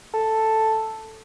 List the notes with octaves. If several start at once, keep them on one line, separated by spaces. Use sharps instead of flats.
A4